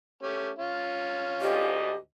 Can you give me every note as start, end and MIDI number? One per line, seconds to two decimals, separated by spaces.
0.23 0.50 57
0.23 0.50 61
0.23 0.50 67
0.58 1.80 61
0.58 1.80 65
1.41 1.93 38
1.41 1.93 44
1.41 1.96 67
1.41 1.93 75